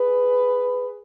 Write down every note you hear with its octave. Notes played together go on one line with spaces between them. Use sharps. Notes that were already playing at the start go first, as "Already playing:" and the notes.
Already playing: G#4 B4